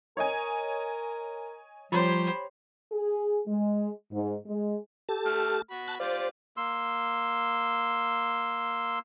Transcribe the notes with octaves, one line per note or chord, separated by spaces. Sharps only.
A#4 C#5 D#5 G#5
F3 G3 G4 C5 C#5 A#5 B5
G#4
G#3
G#2
G#3
G4 A4 A5
A3 F6
F#4 B5
A5 F#6
F4 G4 C5 D5
A#3 C6 E6